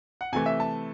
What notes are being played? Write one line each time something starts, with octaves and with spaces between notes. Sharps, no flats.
F#5
C3 E3 A3 G#5
E5
A5